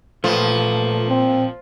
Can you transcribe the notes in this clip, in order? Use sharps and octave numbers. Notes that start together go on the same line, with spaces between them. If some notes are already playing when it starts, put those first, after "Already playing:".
A#2 F3 A3 B4
C4